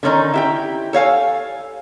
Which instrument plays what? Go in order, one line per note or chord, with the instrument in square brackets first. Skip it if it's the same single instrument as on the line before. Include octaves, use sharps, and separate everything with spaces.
[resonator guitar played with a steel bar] D3 D#3 C#4 D#4
E4 G4 G5
A4 C#5 F5 G#5